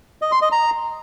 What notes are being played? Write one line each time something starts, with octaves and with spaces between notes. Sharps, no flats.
D#5
C6
D#5
A#5